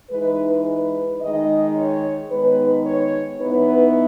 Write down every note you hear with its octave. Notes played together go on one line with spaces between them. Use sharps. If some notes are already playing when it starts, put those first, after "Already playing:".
E3 G#3 D#4 B4
B4
D#3 G#3 D#4 D#5
C#5
D#3 G#3 B3 D#4 B4
C#5
E3 B3 D#4 B4